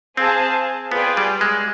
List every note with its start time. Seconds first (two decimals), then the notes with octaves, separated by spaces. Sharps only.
0.17 C4 G#4 C5 F5 A5
0.92 B3 F4 G#4 B4 D5 G5
1.17 G3
1.41 G#3